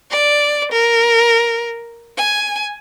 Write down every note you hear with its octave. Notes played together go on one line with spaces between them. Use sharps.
D5
A#4
G#5